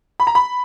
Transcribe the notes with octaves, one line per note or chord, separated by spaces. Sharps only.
B5
A#5
B5